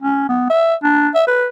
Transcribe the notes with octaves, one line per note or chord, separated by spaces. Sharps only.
C#4
B3
E5
D4
E5
B4